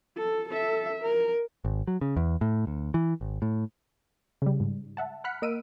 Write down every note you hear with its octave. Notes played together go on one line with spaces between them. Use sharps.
A4
A4 E5
A#4
G#1
F#3
C#3
E2
A2
D2
E3
G#1
A2
C#3 G3
G#2
E5 F#5 A5
F#5 B5 F6 F#6 B6 C#7
A#3 A#4 D#5 E6 D7 D#7